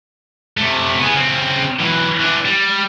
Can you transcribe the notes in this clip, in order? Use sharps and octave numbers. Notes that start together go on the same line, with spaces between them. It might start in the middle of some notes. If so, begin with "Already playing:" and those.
C3 A3
B3 G#4
C#3 C4
E3 F#3
E3 D4
G3